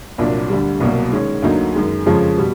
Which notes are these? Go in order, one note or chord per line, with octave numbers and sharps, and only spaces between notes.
C2 A#2 F#3 A#3 D4
D2 D3 G3
C2 B2 F#3 A#3
D#3 G#3 C#4
D2 D3 F#3 A#3 D#4
F#2 D#3 G#3
F2 C#3 F3 G#3 C#4
B2 G3